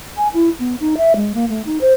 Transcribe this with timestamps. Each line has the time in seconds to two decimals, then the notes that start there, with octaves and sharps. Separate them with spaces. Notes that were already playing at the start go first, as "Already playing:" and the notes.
0.17 G#5
0.34 E4
0.59 B3
0.80 D#4
0.97 E5
1.16 G#3
1.34 A#3
1.49 A3
1.66 D#4
1.81 C5